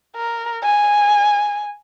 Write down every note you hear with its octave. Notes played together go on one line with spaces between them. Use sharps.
A#4
G#5